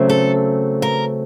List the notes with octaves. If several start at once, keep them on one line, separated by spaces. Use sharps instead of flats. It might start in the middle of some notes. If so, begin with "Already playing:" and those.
Already playing: C#3 F#3 A3 C4
A4
A#4